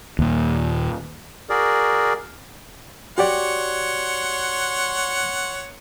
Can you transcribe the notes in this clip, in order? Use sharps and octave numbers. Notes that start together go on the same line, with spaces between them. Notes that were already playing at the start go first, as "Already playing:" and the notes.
D#2 A#2
F#4 G#4 A#4 D5
F#4 G4 C#5 D5 F#5 C6